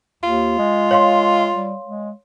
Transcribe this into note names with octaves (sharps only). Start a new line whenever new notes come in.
D#2 F4
G#3
C#5 F5 C6
G3
G#3